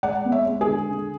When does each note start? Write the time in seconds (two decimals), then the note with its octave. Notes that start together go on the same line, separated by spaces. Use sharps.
0.03 G#3 D5 F#5
0.25 B3
0.32 C#5 E5
0.47 G#3
0.61 G#4
0.68 D3
0.91 D3